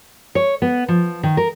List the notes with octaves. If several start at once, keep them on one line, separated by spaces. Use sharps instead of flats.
C#5
B3
F3
D#3
A#4